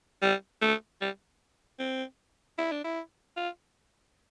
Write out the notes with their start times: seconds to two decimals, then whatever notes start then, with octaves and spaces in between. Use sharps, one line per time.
0.22 G3
0.62 A3
1.01 G3
1.79 C4
2.58 E4
2.72 D4
2.84 E4
3.36 F4